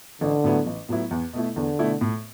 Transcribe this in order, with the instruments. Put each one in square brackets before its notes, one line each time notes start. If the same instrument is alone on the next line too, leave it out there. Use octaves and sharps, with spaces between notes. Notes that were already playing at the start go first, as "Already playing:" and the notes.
[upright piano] A1 [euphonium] D3
[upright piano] A2 F#3 B3 E4
A1
A2 F#3 B3 E4
E2
B2 A3 E4
[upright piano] E2 [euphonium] D3
[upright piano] B2 A3 E4
A2